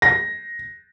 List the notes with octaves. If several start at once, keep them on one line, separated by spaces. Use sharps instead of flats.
A#6